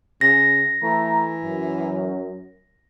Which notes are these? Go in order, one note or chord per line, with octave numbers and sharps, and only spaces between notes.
C#3 A#6
E3 A3 A#5
F#2